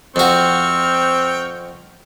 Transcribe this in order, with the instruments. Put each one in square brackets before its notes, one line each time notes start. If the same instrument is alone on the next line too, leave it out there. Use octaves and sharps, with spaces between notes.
[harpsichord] F2 F#4 [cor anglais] C4 [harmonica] G5 C#6 F6